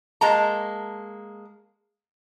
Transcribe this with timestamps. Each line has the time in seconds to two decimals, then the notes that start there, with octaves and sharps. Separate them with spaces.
0.21 G#3 A#3 A5 A#5